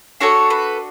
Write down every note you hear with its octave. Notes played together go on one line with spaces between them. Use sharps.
D4 F#4 A4 C#5
B4